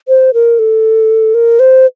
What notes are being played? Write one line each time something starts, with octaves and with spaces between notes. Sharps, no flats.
C5
A#4
A4
A#4
C5